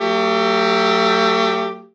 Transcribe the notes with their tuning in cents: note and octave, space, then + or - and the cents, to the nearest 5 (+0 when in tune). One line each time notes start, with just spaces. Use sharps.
F#3 +0 A3 +35 G4 +5